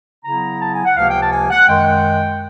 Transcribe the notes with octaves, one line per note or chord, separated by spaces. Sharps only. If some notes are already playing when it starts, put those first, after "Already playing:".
C#3 F#3 B3 E4 A#5
A5
G#5
F#5
C#2 C3 F3 A#3 F5
G5
A5
G#5
F#5
F#2 D#3 G#3 G5